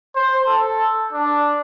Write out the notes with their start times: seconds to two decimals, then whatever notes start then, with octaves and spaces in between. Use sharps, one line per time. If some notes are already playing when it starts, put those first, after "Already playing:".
0.15 C5
0.47 A4
1.13 D4